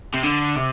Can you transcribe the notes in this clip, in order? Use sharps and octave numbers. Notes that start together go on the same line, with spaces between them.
C3
D3
C3